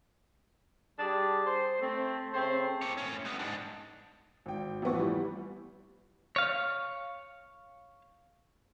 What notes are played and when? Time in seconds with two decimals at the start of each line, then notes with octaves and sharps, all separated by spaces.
0.99 G3 D4 G4 G#4
1.46 C5
1.80 A3 C4
2.33 C#3 A3 C4 C5
2.82 A#3 C#5
2.98 A2 C#4
3.25 G3 B3
3.39 G#2 D4
4.46 G#1 G5
4.82 A1 F3 B3 C#6
4.99 E3 G3
6.36 C#5 F5